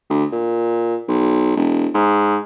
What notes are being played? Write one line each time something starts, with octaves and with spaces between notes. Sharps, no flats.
D2
A#2
B1
E1
G#2